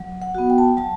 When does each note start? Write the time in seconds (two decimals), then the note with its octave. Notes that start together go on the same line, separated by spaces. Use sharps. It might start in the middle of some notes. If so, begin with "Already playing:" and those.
Already playing: F#3
0.22 F#5
0.35 B3 F#4
0.50 G5
0.58 A5
0.68 G5
0.77 F#3 A5